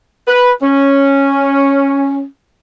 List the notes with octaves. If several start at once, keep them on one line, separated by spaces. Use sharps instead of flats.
B4
C#4